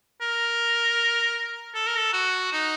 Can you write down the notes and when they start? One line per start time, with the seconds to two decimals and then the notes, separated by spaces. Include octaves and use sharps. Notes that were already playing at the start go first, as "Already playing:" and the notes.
0.21 A#4
1.75 A4
1.87 A#4
1.98 A4
2.13 F#4
2.52 D#4